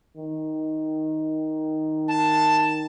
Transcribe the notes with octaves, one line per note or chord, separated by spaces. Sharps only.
D#3
A5